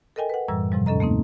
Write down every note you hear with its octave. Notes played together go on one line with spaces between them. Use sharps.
A4 A#4 D#5 G5 G#5
B4 F#5
F#2 A2 E3 G3 E6
G#2 C3 F3 G3
D#2 C#4 A4 D#5 A#5
A3 A#3 C4 D#4